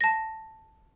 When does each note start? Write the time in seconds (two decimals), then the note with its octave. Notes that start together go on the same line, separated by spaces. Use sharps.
0.01 A5 A#6